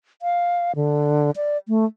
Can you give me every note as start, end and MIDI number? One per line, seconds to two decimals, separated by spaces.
0.22 0.72 77
0.76 1.31 50
1.36 1.57 74
1.68 1.85 57